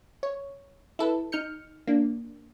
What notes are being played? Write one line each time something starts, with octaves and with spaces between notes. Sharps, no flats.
C#5
E4 A4 B4
D#4 F6 G6 C#7
A#3 D4